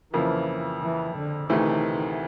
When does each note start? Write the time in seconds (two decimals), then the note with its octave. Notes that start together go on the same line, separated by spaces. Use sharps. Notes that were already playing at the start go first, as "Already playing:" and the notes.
0.13 F2 C#3 E3 F3 A#3
0.82 E3
1.16 D3
1.50 D2 C3 D#3 E3 A3